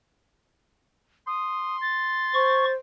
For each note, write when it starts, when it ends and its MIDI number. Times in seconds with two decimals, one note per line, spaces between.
1.27 2.77 84
1.27 1.77 87
1.81 2.72 93
2.34 2.74 72
2.34 2.65 85